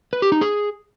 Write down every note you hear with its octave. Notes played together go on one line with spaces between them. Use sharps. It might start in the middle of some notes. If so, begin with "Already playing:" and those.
B4
G4
D#4
G#4